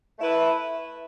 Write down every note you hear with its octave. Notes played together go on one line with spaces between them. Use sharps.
A3 E4 B4